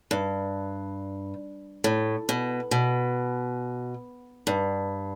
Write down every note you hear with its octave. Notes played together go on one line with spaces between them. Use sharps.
G2
A2
B2
B2
G2